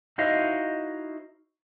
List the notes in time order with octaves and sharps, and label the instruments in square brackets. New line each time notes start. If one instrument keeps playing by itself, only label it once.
[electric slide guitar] D#4 E4 F#4 C5 D#5 F5